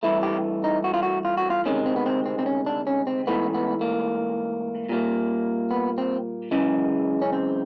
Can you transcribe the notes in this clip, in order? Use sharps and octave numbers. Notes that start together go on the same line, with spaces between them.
G2 E3 A3 E4
G4
D#4
F#4
F4
F#4
F4
F#4
F4
D2 C3 D#3 G#3 C#4
C4
B3
C4
C4
C4
C#4
D4
C#4
C4
G#2 E3 A3 B3
B3
A#3
A#2 G3 A#3
B3
C4
F#2 C#3 E3 G#3
C#4
C4